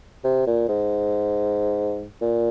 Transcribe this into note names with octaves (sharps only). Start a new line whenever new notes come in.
C3
A#2
G#2
A#2